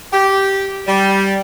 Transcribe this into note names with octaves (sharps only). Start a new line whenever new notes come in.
G4
G3